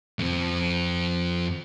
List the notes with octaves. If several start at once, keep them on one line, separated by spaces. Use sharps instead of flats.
F2 C4